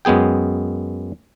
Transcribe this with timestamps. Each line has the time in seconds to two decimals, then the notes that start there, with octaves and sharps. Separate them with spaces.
0.05 F#2 G#3 B3 G#4 G5